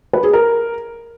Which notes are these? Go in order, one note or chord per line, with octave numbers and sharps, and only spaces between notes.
B4
G#4
A#4